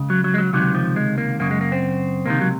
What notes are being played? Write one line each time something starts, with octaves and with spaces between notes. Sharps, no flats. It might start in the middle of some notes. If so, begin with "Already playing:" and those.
Already playing: C#2 C#3
F#3
F#3
G#3
F#3
C#2 C3 D#3 F#3
F3
G#3
A#3
F#2 C#3 A#3
G#3
A#3
C4
C#2 C3 D#3 A#3
F#3